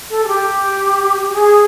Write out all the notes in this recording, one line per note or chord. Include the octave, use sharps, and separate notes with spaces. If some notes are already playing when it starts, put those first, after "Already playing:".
A4
G#4
G4
G#4